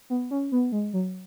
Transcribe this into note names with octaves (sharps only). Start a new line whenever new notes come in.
B3
C#4
B3
G#3
F#3